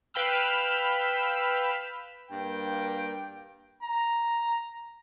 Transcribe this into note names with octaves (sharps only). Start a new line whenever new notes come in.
B4 F5 G5 B5 E6 F6
G2 A#3 G5
A#5